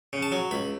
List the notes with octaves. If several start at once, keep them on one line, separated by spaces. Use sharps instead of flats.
C#3
A5
F#3
C#2 B5